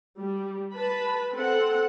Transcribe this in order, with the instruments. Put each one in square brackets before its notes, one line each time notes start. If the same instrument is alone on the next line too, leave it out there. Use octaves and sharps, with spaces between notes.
[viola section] G3
B4 A5 B5
C4 A4 F#5